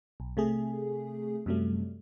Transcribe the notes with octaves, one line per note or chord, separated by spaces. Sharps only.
B1
C3 A3 G#4
F#2 C3 F#3 G3 A3